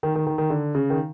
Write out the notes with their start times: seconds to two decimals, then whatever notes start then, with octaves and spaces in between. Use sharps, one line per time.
0.03 D#3
0.15 D#3
0.27 D#3
0.38 D#3
0.50 D3
0.75 C#3
0.90 D#3